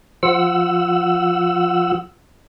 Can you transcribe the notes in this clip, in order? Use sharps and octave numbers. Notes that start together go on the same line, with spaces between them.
F3 F4 F#5 E6